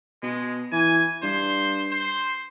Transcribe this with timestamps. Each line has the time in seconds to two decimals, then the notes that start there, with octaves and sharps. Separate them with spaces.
0.22 B2 G#3
0.72 E3 G#5
1.23 G2 C5
1.91 C5